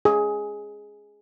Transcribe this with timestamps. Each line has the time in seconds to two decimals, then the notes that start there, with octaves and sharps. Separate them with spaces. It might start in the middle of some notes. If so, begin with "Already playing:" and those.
0.05 G#4